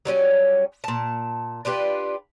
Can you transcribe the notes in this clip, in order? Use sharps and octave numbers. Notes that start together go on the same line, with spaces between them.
F#3 G3 C#4 G#5
A#2 A5
D4 F4 G4 B4